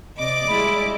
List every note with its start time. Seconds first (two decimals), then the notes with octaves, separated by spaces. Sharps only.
0.19 C3 D5 D#5 D6
0.48 G3 G#3 E4 B5